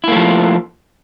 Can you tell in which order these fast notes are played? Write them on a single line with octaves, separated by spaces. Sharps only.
E4 A#3 A3 F3